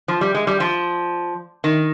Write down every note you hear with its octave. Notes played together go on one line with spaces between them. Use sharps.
F3
G3
G#3
G3
F3
D#3